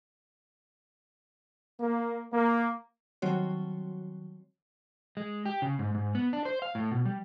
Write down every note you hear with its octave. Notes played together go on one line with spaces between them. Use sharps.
A#3
A#3
D#3 F#3 G3 C4 F#4 C#5
G#3
G4
C#3
G#2
G#2
B3
D4
C5
F5
A2
B2
G3